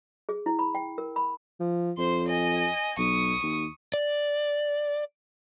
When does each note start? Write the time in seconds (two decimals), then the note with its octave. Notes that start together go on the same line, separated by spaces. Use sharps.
0.29 G#4
0.46 E4
0.59 B5
0.75 G5
0.98 A#4
1.16 B5
1.60 F3
1.98 F2 C5 C6
2.28 D#5 G#5
2.98 B1 C#6 D#6
3.43 D#2
3.94 D5